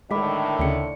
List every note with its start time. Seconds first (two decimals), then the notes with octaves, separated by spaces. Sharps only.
0.11 A2 D3 D#3 G#3 B5 D6 B6
0.59 D2 C#3 D5 C#7